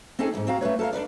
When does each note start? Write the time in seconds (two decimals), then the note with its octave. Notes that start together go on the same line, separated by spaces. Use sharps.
0.19 C4 C#4 D#4 G#4 A4 G#5
0.34 F2 G#2
0.47 C4 F#4 F5 A#5
0.61 A3 C#4 B4 C#5
0.79 A4 A#4 F5
0.93 D4 D#4 B4 D5